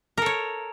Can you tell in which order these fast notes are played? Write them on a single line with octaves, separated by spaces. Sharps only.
A#4 A4 C#5